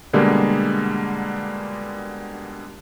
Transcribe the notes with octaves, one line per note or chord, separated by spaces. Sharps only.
B2 D3 G3 G#3 A#3